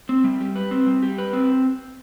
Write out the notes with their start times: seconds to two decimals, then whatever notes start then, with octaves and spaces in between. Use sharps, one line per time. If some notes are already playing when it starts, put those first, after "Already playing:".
0.09 C4
0.24 G3
0.41 G4
0.56 B4
0.71 C4
0.86 G3
1.02 G4
1.18 B4
1.33 C4